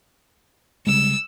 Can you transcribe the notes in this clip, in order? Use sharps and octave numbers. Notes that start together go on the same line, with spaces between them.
C#3 G3 G#3 E6